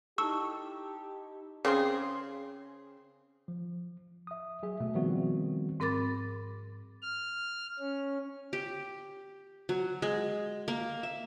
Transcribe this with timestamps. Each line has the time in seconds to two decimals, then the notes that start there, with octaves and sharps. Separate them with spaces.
0.18 D#4 E4 G4 A4 C#6 E6
1.65 C#3 C4 G#4 C6
3.48 F3
4.27 E5 D#6
4.63 F#3 G#4 E5
4.80 B2 A3 E5
4.95 D#3 F3 G3 B3 C4 F#4
5.80 G#2 C4 A#4 B5 D6 A6
7.02 F6
7.79 C#4
8.53 G4
9.69 F#3
10.02 G#3
10.68 A#3
11.03 E5